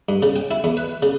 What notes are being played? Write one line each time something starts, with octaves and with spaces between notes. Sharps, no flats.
G2
C#3
G5
E4
E2
B4
C#3